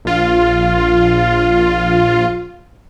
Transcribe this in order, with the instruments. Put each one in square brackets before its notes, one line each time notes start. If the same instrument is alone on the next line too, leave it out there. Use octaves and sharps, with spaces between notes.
[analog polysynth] A#1 F4